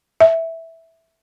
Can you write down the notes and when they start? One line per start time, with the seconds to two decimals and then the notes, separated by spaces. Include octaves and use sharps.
0.20 E5